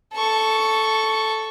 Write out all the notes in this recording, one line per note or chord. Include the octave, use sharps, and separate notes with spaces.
A4 C#6